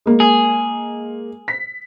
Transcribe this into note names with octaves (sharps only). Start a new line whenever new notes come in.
G#3 A#3
G#4
B6